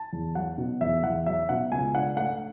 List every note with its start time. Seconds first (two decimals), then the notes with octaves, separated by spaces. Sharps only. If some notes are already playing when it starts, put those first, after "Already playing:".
Already playing: A5
0.13 E2
0.35 F#3 F#5
0.58 B2
0.81 E2 E5
1.03 E2 F#5
1.26 F#3 E5
1.49 B2 F#5
1.71 C#2 G#5
1.94 D4 F#5
2.17 A3 F#5